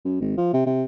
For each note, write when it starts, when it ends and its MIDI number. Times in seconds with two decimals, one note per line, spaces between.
0.05 0.19 42
0.21 0.33 32
0.37 0.52 53
0.53 0.64 48
0.66 0.84 48